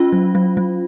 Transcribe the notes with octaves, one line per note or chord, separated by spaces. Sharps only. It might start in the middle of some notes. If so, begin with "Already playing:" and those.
Already playing: C#4 F4
F#3
F#3
F#3